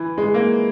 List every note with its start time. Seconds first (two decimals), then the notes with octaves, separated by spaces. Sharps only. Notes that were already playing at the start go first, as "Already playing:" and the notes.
Already playing: E3
0.18 G#3
0.34 A#3